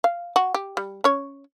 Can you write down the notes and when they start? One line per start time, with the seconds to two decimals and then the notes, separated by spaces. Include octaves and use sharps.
0.04 F5
0.36 F#4
0.54 G4
0.77 G3
1.04 C#4 C#5